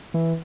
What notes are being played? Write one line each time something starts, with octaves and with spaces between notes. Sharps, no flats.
E3